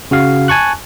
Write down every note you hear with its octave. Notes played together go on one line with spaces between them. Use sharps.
C#3 F#4 F5
G#5 A5 C#6 F#6